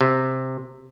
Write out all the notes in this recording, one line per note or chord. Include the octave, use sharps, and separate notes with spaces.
C3